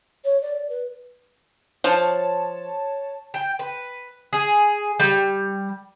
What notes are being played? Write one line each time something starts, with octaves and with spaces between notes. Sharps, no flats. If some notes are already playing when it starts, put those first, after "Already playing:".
C#5
D5
B4
F3 C#5 A5
G5
B4
G#4
G3